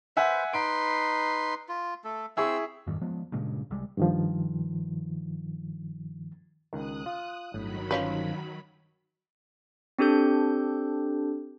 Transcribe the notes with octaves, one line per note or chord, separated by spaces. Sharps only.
B4 C5 E5 F#5 G#5
D#4 B4 C6 D7
F4
A3 A4
C4 E4 G#4 C#6 E6
F2 G#2 D#3 G3
F3 G#3 B3
G2 A#2 C#3 G#3
C2 G3 G#3
G2 D#3 F3
C#2 D#3 D#6 F#6
F4
G1 A2 D#3 F#3 B5
F3 C#4 F4 B4
C4 D4 G4 A4 G6